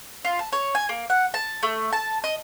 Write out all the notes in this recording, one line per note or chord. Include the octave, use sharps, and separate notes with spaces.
F4
A5
C#5
G#5
A#3
F#5
A5
A3
A5
D#5